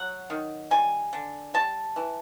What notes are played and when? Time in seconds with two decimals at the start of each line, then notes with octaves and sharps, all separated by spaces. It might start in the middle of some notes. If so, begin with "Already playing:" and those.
Already playing: F#3 F#5
0.30 D#3
0.71 G3 G#5
1.13 D3
1.54 G3 A5
1.96 E3